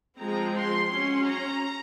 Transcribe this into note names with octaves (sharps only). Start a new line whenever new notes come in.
F3 G#3 C4 A#5
C6
F#3 C#4 C6
A#5